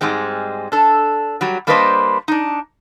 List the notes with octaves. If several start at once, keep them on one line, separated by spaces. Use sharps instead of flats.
G#2 G3 G#3 C4
D4 A4
F#3 G3 F#4
G3 A#3 D4 B4 C5 D#5
D4 D#4